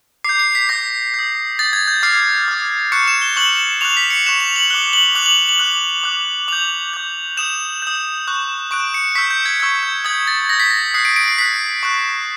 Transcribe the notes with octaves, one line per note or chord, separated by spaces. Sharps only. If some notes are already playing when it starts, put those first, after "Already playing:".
D6 G6 C7
C7
B6
D6 G6 A#6
D#6 G6
D#6 G6 A6
G#6
G6
D6 F6 C7
D6 F6
C#6 F#6 C#7
E7
G7
C#6 F#6 F#7
C#6 F#6 F7
B6
C#7
C#6 F#6 E7
F7
F#7
D6 F#6 G7
F#7
D6 F#6 F7
F#7
F#7
D6 F#6
D6 F#6
D6 G6 F7
D6 G6
D#6 G6 E7
D#6 G6
C#6 F#6
C#6 F#6 D7
C#7
C#6 E6 G6 B6
G6
G#6
C#6 E6 G6 G#6
G6
D#6 G6 G#6
A6
D#6 G6 A#6
B6
A#6
D#6 F#6 C7
D7
D7
C7
D#6 F#6 B6
C#6 F#6